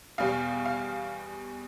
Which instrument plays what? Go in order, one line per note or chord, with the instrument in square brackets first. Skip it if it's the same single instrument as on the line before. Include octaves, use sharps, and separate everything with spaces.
[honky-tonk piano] E2 B2 G3 F5
F5